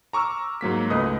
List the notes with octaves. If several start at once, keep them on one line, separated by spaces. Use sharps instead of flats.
A#5 C#6 D6 E6 F6
G#2 F#3 A#3 B6
C#2 A3 B4 D#5 D#6